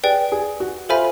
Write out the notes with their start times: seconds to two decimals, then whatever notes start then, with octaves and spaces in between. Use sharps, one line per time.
0.04 G#4 B4 D5 G5
0.32 G#4
0.60 F#4
0.89 F4 A4 C5 E5 G#5 B5